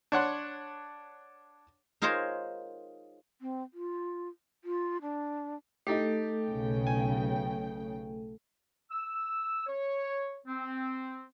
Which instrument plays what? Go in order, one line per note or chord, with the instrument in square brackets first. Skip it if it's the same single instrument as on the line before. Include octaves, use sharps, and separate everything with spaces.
[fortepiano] D4 C#5 F#5 C6
[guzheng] D#4 F4 G#4 A#4 C5 C#5
[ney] C4
F4
F4
D4
[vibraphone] A3 A4 [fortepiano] D#4 G4
[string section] B1 C#3 G5
[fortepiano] G#5
[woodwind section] E6
C#5
C4